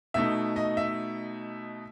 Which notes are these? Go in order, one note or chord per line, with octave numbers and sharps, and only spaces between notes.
B2 A3 D#4 E5
D#5
E5